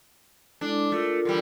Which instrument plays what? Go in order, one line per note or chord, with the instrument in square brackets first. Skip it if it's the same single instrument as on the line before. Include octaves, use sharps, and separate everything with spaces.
[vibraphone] G#3 E4 A4 [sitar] D4
[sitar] A3 [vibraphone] F4 A4 A#4
[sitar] D3 E3 G3